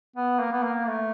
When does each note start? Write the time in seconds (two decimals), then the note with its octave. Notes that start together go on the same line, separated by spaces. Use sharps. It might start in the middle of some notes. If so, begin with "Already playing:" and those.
0.16 B3
0.40 A#3
0.52 B3
0.63 A#3
0.87 A3